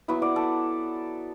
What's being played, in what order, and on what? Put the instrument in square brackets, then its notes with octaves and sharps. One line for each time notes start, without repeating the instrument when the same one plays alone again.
[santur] F#3 B3 E4
D5 F#5
A4